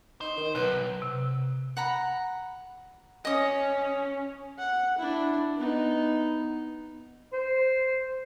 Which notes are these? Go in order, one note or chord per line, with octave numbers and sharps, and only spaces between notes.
D#4 C5
D#3
B1 B4
C3
F#5 A#5 B5
C#4 D#5 D#6
F#5
D4 E4
B3 D#4
C5